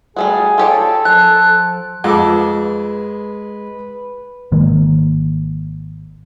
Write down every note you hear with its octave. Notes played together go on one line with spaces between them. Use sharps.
G3 A3 F#4 G#4
F4 G4 A4 C#5
F3 A#4 F#6
F2 G#3 A4 B4 D6
G#1 D#3 G#3 A#3